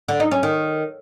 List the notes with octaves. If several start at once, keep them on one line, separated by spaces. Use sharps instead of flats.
D3
D#4
C#4
D#3